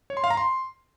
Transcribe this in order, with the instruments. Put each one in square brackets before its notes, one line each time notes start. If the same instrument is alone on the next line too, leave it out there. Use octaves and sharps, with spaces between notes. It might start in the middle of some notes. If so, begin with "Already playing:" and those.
[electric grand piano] C#5
C6
F5
A#5
C6